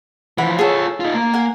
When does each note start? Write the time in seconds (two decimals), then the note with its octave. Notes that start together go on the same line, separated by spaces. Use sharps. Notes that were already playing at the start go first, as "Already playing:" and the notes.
0.38 E3 F3 F#5 B5
0.59 F4 G#4 A4 C#5
1.00 D#4 F4
1.14 A#3
1.34 A#4 F#5 G#5